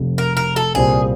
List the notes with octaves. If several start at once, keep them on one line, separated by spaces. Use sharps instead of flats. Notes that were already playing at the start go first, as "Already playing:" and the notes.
Already playing: F1 F2 C3
A#4
A#4
A4
C2 A#2 G3 C4 F4 G#4